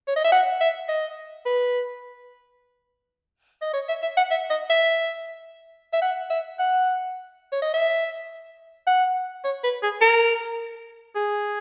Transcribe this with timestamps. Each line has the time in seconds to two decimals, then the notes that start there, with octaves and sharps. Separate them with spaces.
0.08 C#5
0.16 D#5
0.24 E5
0.32 F#5
0.61 E5
0.89 D#5
1.46 B4
3.62 D#5
3.74 C#5
3.89 E5
4.02 E5
4.17 F#5
4.31 E5
4.50 D#5
4.70 E5
5.93 E5
6.02 F#5
6.30 E5
6.59 F#5
7.52 C#5
7.62 D#5
7.74 E5
8.87 F#5
9.45 C#5
9.63 B4
9.83 G#4
10.01 A#4
11.15 G#4